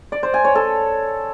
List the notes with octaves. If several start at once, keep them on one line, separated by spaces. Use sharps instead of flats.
D5
C5
G#5
C#5
A4